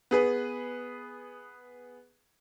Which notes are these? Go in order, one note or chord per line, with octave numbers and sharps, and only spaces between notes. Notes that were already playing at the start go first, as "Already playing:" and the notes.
B3 G#4 B4